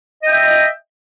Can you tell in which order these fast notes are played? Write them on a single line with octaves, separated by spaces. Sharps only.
D#5 G5 E5